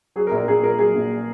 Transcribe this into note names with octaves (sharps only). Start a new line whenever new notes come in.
F#3 G#4
A#4
A#1
A#4
A#1 G#4
A#2 A#4
F#3 G#4
A#1